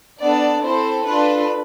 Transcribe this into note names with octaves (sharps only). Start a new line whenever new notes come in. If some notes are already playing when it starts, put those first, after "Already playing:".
B3 D4 A4 D5
C4 E4 A4 C5
D4 F4 A4 B4